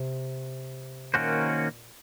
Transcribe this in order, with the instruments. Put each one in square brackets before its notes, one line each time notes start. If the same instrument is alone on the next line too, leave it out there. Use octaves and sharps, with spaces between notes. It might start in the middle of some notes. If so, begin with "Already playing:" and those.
Already playing: [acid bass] C3
[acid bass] A#2 [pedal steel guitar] D#3 A#3 C#4 F#4 C5
[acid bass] C3
A#2